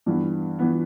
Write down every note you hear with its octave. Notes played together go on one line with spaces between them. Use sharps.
G2 E3 B3
E3 B3